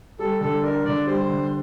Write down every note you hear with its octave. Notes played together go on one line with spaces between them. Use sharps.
G3 A4
D3 A4
D4 A#4
D3 D5
G3 C5
D3